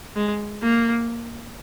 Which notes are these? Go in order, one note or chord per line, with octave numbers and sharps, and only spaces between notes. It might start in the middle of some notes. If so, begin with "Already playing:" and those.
G#3
A#3